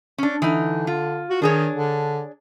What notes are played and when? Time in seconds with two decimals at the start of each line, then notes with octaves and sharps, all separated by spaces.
0.18 C#4 D4
0.42 D3 E3 D#4
0.87 F4
1.30 F#4
1.42 D#3 D4 G#4 C#5
1.76 D3